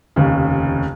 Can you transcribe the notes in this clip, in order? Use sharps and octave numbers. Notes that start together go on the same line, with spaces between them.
F1 D#2 C#3